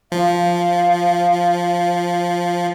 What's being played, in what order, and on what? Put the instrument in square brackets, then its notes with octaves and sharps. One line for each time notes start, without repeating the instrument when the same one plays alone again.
[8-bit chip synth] F3 [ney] F5